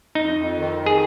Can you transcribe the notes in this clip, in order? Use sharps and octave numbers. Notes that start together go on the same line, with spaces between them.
F2 D#4
F2
D#3
D#3
G#4